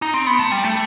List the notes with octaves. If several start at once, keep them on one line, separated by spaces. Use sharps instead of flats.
D#4
C4
B3
A3
G3
A3